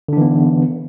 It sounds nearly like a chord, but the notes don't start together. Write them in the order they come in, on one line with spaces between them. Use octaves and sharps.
D3 D4 E3 B3